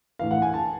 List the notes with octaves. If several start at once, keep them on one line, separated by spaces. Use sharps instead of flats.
A2 E3 F5
F#5
G#5
A5